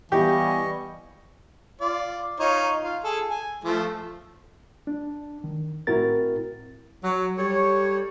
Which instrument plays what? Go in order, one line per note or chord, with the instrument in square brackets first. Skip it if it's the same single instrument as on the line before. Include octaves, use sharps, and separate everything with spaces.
[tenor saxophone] E3 [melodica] G3 D#5 C#6 [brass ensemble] B3 F5 G#5 [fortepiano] G4
[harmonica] F4 D5
D#4 F4 C#5
F4
G#4 A4
G#5
F3 A3
[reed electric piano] D4
D#3
A2 C4 E4 F#4 A#4 A6
[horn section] F#3
G3 A4 C#5